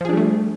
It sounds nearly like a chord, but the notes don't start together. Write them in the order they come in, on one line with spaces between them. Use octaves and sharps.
F3 G#4 D4 G3 A3